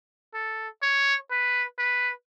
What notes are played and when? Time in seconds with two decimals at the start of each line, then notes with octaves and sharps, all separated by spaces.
0.34 A4
0.82 C#5
1.31 B4
1.79 B4